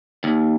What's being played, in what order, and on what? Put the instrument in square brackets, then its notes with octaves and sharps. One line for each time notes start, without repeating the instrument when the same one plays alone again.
[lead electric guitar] D#2